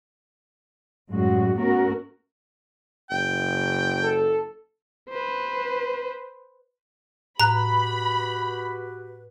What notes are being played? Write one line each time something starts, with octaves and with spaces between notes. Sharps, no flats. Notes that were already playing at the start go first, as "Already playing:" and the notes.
F#2 A2 G3 G#3 F#4
A3 B3 C#4 F#4 A#4
F#1 G5
A4
B4 C5
A2 F#4 G4 B4 A#5 B5 F#6